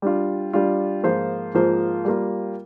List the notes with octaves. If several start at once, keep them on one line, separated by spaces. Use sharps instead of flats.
G3 D4 F4
G3 D4 F4
G#2 F3 A#3 F4 C5
G#2 F3 A#3 F4 C5
G3 A#3 F4